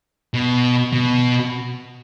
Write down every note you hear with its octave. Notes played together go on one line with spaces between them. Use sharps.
B2
B2